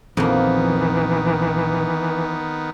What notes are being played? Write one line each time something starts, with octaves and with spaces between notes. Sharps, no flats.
A#1 F2 D#3 E3 A#3 B3